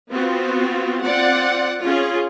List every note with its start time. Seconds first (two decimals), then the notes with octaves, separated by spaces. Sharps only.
0.11 B3 C4 F4 F#4
1.04 C4 F4 D5 F#5
1.84 C#4 F4 G#4